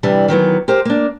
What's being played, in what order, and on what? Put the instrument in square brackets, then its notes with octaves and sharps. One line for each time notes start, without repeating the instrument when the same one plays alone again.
[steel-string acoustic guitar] C3 E3 G3 D4
D#3 E3 F#3 B3
G4 A#4 C5
A#3 D4